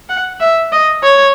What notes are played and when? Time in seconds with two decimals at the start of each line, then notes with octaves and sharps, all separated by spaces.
0.09 F#5
0.40 E5
0.72 D#5
1.03 C#5